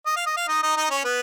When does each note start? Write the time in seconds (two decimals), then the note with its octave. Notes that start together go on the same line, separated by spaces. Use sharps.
0.06 D#5
0.16 F5
0.26 D#5
0.37 F5
0.48 D#4 D#5
0.63 D#4 D#5
0.76 D#4 D#5
0.90 C#4 C#5
1.05 B3 B4